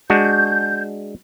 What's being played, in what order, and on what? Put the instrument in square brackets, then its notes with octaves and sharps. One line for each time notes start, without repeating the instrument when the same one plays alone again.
[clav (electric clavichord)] G#3 D4 F#4 [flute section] G6